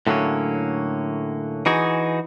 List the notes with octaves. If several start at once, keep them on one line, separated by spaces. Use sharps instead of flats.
A2 D3 F#3 A#3 C#4
E3 D#4 F#4 G#4